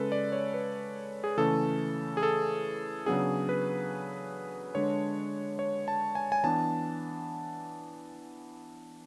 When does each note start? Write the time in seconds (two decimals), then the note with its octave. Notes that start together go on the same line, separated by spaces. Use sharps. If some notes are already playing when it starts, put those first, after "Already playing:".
Already playing: C#3 G#3 C#4 A4 B4
0.12 D5
0.32 C#5
0.54 B4
1.24 G#4
1.37 C#3 E3 A3 C#4 A4
2.17 G#4
2.23 A4
3.06 C#3 F#3 B3 D4 G#4
3.49 B4
4.75 D3 G#3 D4 C#5
5.59 C#5
5.88 A5
6.15 G#5
6.32 G#5
6.44 E3 B3 D4 A5